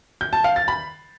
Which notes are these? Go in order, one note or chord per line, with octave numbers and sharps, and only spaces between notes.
G6
A5
F5
A6
B5